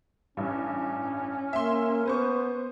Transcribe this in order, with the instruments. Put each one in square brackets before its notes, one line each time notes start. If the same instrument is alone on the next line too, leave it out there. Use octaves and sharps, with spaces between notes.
[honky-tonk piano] A1 G2 [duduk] C#4
[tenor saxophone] A#3 [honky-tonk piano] E5 C6
[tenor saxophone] B3 [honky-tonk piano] B4 C5 C#6